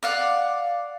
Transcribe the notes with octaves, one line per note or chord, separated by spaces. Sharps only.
D5 F5 F#5